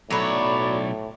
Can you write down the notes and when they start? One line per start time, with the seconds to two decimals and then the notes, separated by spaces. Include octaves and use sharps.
0.10 B1 A2 F#3 A4 B4 C#5 D5